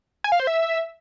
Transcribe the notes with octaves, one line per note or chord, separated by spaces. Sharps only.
G#5
F5
C5
E5